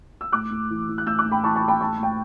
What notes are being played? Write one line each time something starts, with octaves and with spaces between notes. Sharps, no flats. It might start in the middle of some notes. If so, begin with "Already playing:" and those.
E6
A2 D6 F#6
A2
E3
E3
F#6
A2 E6 G6
D6 F#6
A2
G5 B5
E3 A5 C#6
A5 C#6
E3
G5 B5
A2 A5 C#6
A2 G5